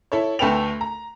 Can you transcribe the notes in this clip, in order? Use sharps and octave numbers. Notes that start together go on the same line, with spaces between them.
E4 A4 C#5
D2 A3 A4 B4 G5 F7
A#5